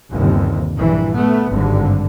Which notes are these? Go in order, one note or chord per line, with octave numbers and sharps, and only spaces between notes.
G1 D#2 C3
A#1 G2 E3
A3 B3
G#1 G2 D3